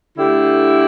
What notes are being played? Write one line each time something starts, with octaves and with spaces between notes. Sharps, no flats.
D3 A3 E4 G4